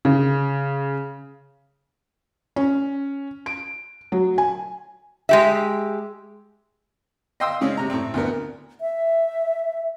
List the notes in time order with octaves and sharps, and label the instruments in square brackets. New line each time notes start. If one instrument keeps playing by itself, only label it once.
[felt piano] C#3
C#4
D7
F#3
G#5
[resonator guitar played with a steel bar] G#3 G4 E5
[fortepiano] D#5 F5 G5 C6 D#6 E6
C#3 G#3 C4 C#4
C3 A#5
A2 C4
D2 B3 A#4
[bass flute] E5